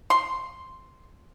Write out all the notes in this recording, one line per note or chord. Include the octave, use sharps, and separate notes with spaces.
C6